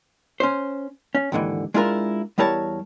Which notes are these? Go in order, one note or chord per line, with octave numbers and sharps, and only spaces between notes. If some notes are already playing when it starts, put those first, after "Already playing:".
C#4 C5
C#4
D#2 G#2 D3 E3
G#3 D4 E4 F4 G#4 A#4
E2 G3 E4 A#4 C#5 A5